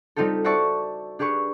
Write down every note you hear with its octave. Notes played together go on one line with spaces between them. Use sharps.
G3 C4 D#4 F4 G4 A4
F#4 C5 D5 E5 A5 C#6
D4 G4 G#4 B4 C#6